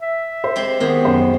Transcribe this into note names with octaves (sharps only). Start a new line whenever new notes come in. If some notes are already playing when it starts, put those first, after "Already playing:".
E5
C5
G#3 C4 G4
D#3 G#3 A#3 B3 G4
F#2 C5